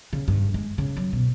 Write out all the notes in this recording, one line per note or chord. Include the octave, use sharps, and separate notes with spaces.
C#3
G2
G#3
C#3
F#3
B2